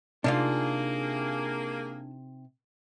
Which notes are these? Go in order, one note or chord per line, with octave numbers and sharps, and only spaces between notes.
C3 A#3 D4 D#4 F4 G#4